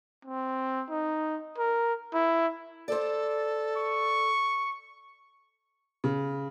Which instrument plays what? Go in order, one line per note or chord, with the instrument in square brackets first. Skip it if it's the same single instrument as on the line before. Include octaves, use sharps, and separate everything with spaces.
[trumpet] C4
D#4
A#4
E4
[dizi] A4 [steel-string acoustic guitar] C5 D5
[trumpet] C#6
[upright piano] C#3